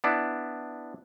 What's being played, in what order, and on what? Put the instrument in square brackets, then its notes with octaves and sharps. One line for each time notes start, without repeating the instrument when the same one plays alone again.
[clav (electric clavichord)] B3 D4 E4